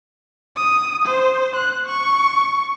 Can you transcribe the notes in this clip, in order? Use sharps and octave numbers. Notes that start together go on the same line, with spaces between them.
D#6
C5
F#6
C#6